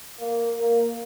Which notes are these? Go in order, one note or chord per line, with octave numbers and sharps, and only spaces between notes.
A#3
A#3